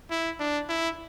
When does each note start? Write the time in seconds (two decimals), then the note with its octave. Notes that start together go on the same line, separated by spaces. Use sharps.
0.10 E4
0.40 D4
0.69 E4